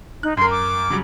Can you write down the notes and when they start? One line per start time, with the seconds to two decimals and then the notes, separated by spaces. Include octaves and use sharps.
0.23 D#4 F#6
0.37 F#2 A#4 C6
0.51 D6
0.90 C#3 F#3 G3